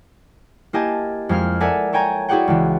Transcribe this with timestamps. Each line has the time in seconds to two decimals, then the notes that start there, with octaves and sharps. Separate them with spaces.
0.73 A#3 E4 G4 D#5 G#5 A5
1.29 F2 G#3 F4 F6
1.60 A4 A#4 D5 E5 F#5 G#5
1.93 A4 C#5 G5 G#5 A#5
2.29 E4 F#4 G#4 D5 F#5 G5
2.48 C#2 E3